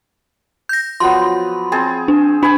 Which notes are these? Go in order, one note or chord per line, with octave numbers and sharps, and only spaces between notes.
G6 A#6
F3 F#3 B3 C6
C4 G#4 A5
D4
D4 G#5 B5